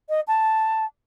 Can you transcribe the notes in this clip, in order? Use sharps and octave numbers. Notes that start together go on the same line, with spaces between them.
D#5
A5